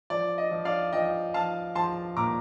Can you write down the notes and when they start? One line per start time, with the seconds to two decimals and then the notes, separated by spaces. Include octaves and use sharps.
0.10 F3 D5
0.38 D#5
0.51 F3
0.65 D5 F5
0.93 F3 D#5 G5
1.34 F3 F5 A5
1.75 F3 A5 C6
2.17 A#2 A#5 D6